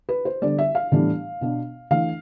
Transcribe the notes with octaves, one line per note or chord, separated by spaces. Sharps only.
B4
C5
D3 G3 B3 D4 D5
E5
F5
A2 E3 G3 B3 D4
B2 B3 D4
E3 A3 D4 F5